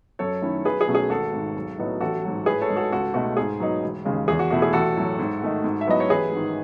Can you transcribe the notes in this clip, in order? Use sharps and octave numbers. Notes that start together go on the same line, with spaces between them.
F#2 A4 C#5
D#3 A3 C#4 E4
B1 G#4 B4
G#4
B2 F#3 A3 C#4
G#4
G#1 F#4 A4
G#2 D#3
B1
A2 F#3 B3 D#4
A1 F#4 A4
G#2 F#3
A2 G#4 B4
A4 C#5
G#3 D#4
F#4 A4
C#2 F#4 A4
B2 A3 D#4 F#4
G#2 G#4
F#3 B3 D#4
E1
D#2 C#3 G#3
E2 G#4
F#4
B2 A3 E4 F#4
G#4
A1 F#4 A4
A2 F#3 A3
G#2
D#3 A3 D#4
G#2
E5
F#3 B3 E4 D#5
C#5
A1 G#4 B4
G#2 D#3